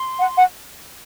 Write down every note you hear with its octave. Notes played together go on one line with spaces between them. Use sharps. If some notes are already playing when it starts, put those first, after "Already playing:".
Already playing: C6
F#5
F#5